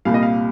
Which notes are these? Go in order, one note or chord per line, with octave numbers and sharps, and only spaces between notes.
C2 A#2 G3 F5
D#5
F5